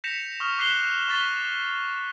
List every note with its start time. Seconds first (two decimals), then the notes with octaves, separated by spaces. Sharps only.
0.04 G6 A#6 B6 C#7 E7 F7
0.40 C#6 D#6 F6
0.58 D6 F#6 B6 C7 E7 G7
1.08 C#6 F#6 A6 B6 G7